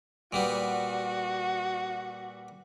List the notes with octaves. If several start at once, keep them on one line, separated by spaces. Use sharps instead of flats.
A#2 G3 B3 F#4